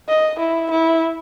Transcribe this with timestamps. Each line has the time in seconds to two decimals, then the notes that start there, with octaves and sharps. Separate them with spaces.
0.09 D#5
0.39 E4
0.71 E4